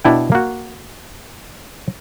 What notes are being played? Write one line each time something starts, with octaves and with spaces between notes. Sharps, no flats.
B2 D4 E4 G5
A#3 F#4